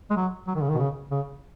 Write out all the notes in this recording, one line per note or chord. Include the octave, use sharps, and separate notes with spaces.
G#3
F#3
F#3
D#3
C#3
D#3
B2
C#3
C#3